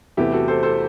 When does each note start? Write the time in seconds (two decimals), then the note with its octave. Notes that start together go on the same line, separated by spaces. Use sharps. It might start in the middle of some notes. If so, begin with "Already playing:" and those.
0.17 E2 C3 E3 A3 E4 G4
0.32 F#4 A4
0.48 A4 C5
0.63 A4 C5